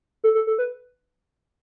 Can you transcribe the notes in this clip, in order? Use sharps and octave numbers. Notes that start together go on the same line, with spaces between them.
A4
A4
A4
B4